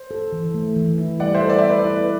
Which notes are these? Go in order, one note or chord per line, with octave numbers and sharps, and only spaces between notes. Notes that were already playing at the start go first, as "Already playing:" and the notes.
Already playing: C5
A4
E3
A3
E3
E4
G3 D5 F#5
C5 E5
A4
D5
E5
B3
B4 D5
E4
B4